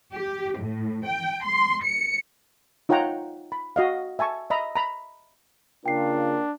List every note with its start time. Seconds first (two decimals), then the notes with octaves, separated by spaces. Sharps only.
0.15 G4
0.61 A2
1.06 G5
1.46 C6
1.85 C#7
2.89 D#4 F4 C#5 F#5 G5 A#5
3.52 B5
3.76 F#4 D#5 F5
4.19 E5 G#5 A5 C#6
4.50 D#5 E5 A#5 B5
4.76 A#5 B5
5.86 C#3 A#3 D4 F4 G5 C7